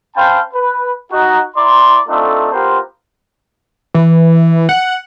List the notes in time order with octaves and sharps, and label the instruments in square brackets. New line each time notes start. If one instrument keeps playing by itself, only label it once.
[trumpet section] C#4 C5 F5 G5 A5 B5
B4
D#4 F#4
E4 D5 A#5 C6
A3 C4 D4 D#4 F4 A4
B3 F4 G4 A#4 C5
[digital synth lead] E3
F#5